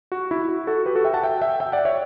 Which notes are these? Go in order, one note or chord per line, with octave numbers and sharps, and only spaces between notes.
F#4
E4
F#4
F#4 A4
G4 B4
F#4 A4
E5 G5
F#5 A5
E5 G5
E5 G5
E5 G5
D5 F#5
C#5 E5